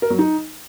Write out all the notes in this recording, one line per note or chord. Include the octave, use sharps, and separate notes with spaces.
A#4
F#3
D#4